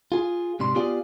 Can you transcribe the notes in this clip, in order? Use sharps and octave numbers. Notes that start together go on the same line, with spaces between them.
F4 G#4
G#2 C3 G3 C6
B3 F4 G4 G#4 D5 F5